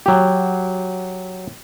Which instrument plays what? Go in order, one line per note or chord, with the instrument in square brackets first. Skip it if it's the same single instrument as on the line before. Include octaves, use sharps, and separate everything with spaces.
[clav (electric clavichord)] F#3 G4